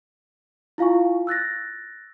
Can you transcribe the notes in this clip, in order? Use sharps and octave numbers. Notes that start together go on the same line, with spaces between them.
E4 F4 F5 G#5 C#6
E6 F#6 A6 A#6